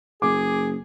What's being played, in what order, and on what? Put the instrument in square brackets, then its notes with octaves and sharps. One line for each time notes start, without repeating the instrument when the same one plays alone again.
[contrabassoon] F#1 [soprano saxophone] G#4 [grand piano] D6